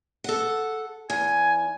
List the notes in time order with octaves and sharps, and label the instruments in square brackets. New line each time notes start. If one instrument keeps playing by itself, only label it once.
[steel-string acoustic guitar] A4 F#5
[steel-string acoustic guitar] E2 [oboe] G#5